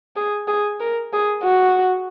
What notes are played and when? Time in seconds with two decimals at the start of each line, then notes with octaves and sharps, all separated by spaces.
0.16 G#4
0.48 G#4
0.80 A#4
1.13 G#4
1.44 F#4